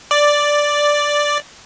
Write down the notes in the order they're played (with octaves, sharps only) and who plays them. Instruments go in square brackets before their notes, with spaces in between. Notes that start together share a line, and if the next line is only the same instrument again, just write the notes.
[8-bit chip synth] D5